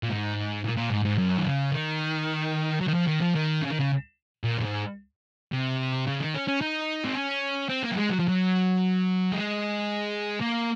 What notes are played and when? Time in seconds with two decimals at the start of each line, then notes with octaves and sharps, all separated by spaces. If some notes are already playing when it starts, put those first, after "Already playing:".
0.03 A#2
0.09 G#2
0.64 A#2
0.77 A#2
0.90 G#2
1.05 G#2
1.18 F#2
1.38 D#3
1.45 C#3
1.72 D#3
2.81 F#3
2.88 D#3
2.94 F3
3.08 D#3
3.22 F3
3.35 D#3
3.62 C#3
3.70 D#3
3.79 C#3
4.44 A#2
4.58 F#2
4.62 G#2
5.52 C3
6.07 C#3
6.20 D#3
6.34 C#4
6.48 C#4
6.61 D#4
7.05 C4
7.15 C#4
7.69 C4
7.83 A#3
7.91 F#3
7.97 G#3
8.10 F#3
8.19 F3
8.28 F#3
9.32 G#3
10.41 A#3